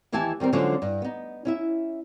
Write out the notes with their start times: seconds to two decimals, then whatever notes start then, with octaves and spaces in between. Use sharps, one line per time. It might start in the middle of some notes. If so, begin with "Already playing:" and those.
0.12 D#2 E3 E4 G4 G#5 A5
0.40 D#3 G3 C4 A#4
0.53 D3 F3 F#3 G#3 C#4 D4
0.82 G2
1.02 B3 D#4
1.45 C#4 E4 E5